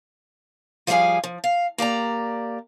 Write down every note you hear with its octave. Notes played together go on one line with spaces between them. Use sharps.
F3 G3 G#4 E5 F5 G#5
F3
F5
A#3 G4 D5 A#5